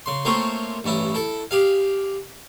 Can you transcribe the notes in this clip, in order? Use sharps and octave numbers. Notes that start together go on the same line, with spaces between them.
C#3 C6
A3 A#3 C4 F4 C5 C#5
A1 G2 C#4 E4
E4 A4
G4 G#4 F5